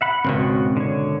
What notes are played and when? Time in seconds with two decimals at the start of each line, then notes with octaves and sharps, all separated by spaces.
0.01 E5 F#5 B5
0.25 G#1 C#2 B2 C4 F#4
0.77 D3 C#5